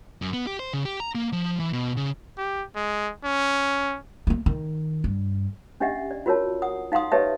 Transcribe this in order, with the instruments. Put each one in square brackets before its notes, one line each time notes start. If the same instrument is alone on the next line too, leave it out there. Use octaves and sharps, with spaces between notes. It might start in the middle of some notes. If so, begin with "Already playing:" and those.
[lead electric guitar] F#2
B3
G4
C5
C#3
G4
A#5
A#3
F3
E3
B2
C#3
[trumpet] G4
G#3
C#4
[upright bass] A3 A#3
D#3
G2
[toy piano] C#4 D4 G4 D#5 E5 F#5
D5
F4 F#4 A#4 C#5 A5
F#5 D#6
D#4 F5 F#5 C6 D#6
G4 B4 C#5 D#5 E5 A5